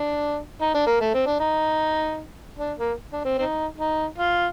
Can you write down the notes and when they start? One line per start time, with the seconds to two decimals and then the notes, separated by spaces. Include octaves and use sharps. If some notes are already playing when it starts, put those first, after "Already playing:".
Already playing: D4
0.61 D#4
0.74 D4
0.87 A#3
1.01 A3
1.14 C4
1.26 D4
1.40 D#4
2.59 D4
2.79 A#3
3.13 D4
3.25 C4
3.38 C4 D#4
3.78 D#4
4.18 F4